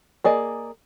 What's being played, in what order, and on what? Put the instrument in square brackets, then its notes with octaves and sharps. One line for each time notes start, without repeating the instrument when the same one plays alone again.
[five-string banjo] A#3 G#4 D5 D#5